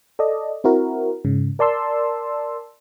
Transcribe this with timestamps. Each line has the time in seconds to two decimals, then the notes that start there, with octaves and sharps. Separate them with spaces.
0.19 A4 D5 D#5
0.64 C4 E4 F#4 A#4
1.24 G#2 C#3
1.59 A#4 D5 A5 C6 E6